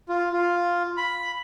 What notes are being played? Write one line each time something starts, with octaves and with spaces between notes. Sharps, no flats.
F4
F4
B5